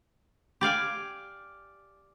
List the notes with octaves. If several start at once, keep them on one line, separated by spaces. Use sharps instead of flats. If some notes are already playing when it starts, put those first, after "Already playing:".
G4 D5 F5 G#5